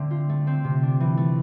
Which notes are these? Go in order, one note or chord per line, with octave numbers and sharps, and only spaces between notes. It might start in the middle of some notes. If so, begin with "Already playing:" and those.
Already playing: D3 A3 C4
F4
A3
C4
C3
D4
E3
A3